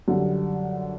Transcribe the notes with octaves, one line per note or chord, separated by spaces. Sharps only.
F#2 D3 G3